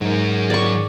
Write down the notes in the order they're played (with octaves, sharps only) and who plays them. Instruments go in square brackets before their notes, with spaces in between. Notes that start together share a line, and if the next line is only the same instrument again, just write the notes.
[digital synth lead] G#2 [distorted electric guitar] F#3 A#4
[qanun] D5 C#6